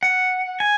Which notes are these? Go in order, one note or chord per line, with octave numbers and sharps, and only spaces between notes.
F#5
G#5